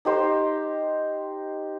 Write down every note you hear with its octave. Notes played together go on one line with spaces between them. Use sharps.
D#4 G4 C5